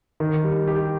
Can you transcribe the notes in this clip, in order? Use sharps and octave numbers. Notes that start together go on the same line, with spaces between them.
D#3
G3
G4